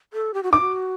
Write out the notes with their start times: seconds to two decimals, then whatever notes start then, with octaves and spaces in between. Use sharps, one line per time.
0.13 A4
0.34 G4
0.43 F#4
0.52 D#4 D6
0.61 F#4